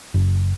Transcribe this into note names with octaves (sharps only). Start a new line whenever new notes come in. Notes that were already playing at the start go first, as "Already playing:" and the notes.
F#1